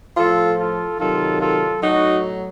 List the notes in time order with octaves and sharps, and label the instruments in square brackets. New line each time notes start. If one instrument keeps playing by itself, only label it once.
[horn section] A2 F3 F4 A4
F4 A4
C3 D#3 F#3 F4 A4
F4 A4
A2 F#3 D#4 F#4